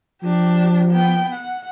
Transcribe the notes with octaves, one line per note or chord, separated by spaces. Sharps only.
F3 D4 G4
B3 G5
F#5